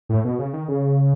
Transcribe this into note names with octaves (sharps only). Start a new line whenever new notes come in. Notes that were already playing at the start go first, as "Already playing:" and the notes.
A2
B2
C#3
D#3
C#3